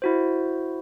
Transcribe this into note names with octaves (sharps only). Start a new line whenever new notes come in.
E4 F#4 C5